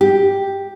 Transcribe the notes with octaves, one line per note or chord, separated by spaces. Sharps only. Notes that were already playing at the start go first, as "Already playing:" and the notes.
G4